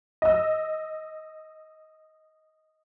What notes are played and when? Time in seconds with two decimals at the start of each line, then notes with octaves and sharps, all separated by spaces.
0.22 D#5 E6